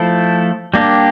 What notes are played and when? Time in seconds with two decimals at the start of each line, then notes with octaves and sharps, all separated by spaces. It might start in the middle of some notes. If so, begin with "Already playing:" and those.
Already playing: F3 A3 E4 A4 C5
0.74 G3 A#3 D4 G4